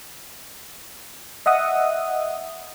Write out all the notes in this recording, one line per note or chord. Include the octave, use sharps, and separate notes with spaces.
D#5 E5 F#5 D#6